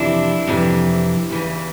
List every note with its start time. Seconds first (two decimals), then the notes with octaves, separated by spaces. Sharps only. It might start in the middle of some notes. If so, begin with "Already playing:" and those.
Already playing: F2 C3 E3 D4 E4
0.47 F2 C3 E3
1.30 E2 C#3 E3